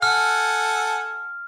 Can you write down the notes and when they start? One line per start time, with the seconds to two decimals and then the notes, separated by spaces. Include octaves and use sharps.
0.02 A4 F#5 G#5 F6